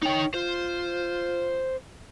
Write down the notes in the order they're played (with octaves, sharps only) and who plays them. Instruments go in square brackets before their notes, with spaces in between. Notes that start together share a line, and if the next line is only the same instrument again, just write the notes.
[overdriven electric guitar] D#4 G5 [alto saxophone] C#5
[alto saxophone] F4 [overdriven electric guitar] C5